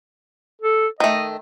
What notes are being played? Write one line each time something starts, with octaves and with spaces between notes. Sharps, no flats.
A4
D#3 A3 D#5